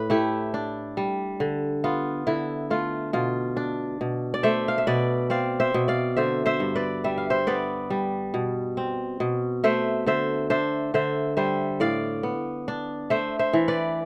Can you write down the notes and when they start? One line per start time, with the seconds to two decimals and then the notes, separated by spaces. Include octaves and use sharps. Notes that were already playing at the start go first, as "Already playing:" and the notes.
Already playing: A2 B4
0.10 A3 E4 G4
0.54 D4
0.97 G3
1.40 D3
1.84 B3 F4
2.27 D3 E4
2.70 A3 F4
3.13 B2 F4
3.57 D4
4.01 B2
4.34 D5
4.43 A3 C5 E5
4.68 F5
4.78 E5
4.87 B2 B4 D5
5.30 C4 D5 F5
5.60 C5 E5
5.74 B2
5.88 D5 F5
6.17 D3 C5 E5
6.46 C5 E5
6.60 G2
6.75 B4 D5
7.04 G3 E5
7.18 F5
7.30 C5 E5
7.47 B3 B4 D5
7.90 G3
8.34 B2
8.77 C4
9.20 B2
9.64 A3 C5 E5
10.06 D3 C5 E5
10.50 D4 C5 E5
10.94 D3 C5 E5
11.37 G3 C5 E5
11.80 A2 D5 F5
12.23 B3
12.68 D4
13.10 A3 C5 E5
13.39 C5 E5
13.53 E3
13.68 B4 D5